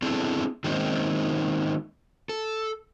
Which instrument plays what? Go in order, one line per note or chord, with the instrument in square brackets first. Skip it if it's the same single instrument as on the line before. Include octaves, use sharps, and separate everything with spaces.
[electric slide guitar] B3 C4 D4 E4 G#4 A4
D#3 G#3 A#3 C4 C#4 D#4
A4